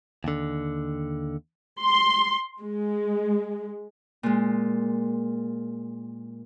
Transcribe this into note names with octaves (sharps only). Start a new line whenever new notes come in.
D#2 D3
C6
G#3
A#2 G#3